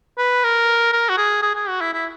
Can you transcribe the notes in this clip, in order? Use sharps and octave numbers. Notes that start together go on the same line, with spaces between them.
B4
A#4
A#4
F#4
G#4
G#4
G#4
F#4
E4
E4